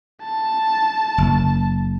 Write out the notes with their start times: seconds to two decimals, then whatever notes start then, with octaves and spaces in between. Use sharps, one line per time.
0.23 A5
1.18 F#1